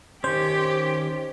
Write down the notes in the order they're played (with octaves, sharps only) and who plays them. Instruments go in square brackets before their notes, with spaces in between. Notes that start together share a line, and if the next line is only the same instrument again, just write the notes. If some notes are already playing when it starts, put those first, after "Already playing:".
[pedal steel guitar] D#3 C#4 [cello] G4 [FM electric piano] C5